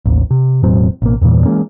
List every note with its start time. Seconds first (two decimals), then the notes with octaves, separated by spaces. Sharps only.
0.05 A1 D#2
0.31 C3
0.63 E1 A2 F#3 C4
1.02 A1 B2 A#3
1.21 E2 G2 A#2 E3
1.45 E3 G#3 A#3 C#4